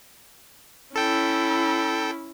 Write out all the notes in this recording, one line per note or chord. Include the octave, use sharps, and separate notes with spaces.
C#4 E4 A4 G5